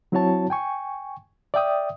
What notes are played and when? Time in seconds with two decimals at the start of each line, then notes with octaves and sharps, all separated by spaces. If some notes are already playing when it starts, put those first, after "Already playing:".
0.12 F#3 C4 E4 F#4 C#5 A5
0.50 G5 G#5 C#6
1.54 D5 E5 G5 D#6